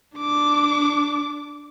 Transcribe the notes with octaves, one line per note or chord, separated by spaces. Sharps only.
D4 D6